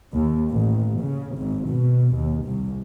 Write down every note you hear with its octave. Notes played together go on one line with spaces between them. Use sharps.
D#2
A1
C#3
G#1
B2
D#2
C2